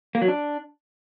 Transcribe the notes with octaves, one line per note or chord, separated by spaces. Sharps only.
A#3
F#3
D4